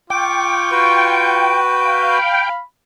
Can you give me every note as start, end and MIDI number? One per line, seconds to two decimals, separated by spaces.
0.10 1.58 65
0.10 2.49 79
0.10 1.58 85
0.10 0.70 86
0.71 2.18 66
0.71 2.18 71
1.84 2.63 77
1.84 2.63 83